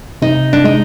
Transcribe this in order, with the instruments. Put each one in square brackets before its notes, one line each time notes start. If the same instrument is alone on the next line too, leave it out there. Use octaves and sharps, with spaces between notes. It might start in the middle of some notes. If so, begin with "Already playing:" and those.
[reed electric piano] C3 [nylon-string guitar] D#4
[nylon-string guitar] D4
[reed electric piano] G#3 [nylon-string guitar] D#4